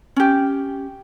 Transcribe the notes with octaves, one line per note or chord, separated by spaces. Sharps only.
C#4 G4